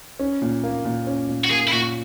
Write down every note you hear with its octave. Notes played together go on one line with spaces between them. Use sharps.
C#4
A#2
A#3
A#2
C#4
A#2
F#4
A#3 G#4
E4
A#2 F#4